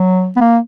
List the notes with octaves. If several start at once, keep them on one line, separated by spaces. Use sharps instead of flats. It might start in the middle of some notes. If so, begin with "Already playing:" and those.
Already playing: F#3
B3
A#3